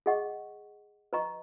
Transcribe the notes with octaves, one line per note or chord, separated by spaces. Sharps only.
G#4 D#5 F#5 C#6
B4 D#5 A#5 C#6